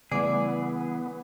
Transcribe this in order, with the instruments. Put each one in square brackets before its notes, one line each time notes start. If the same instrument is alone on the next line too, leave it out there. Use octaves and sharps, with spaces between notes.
[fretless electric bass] C#3 G3 A3 [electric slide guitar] E3 G#4 [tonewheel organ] B3 [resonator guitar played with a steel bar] D5